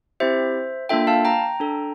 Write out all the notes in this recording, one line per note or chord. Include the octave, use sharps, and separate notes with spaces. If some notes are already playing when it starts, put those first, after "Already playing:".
C4 E4 G4 C5 E5
A#3 D4 F4 A4 E5 G5
F5 A5
G5 A#5
D4 A4